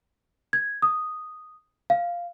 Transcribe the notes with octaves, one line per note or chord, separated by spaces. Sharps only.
G#6
D#6
F5